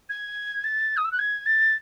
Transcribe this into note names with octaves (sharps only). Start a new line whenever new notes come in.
G#6
A6
D#6
E6
F#6
G#6
A6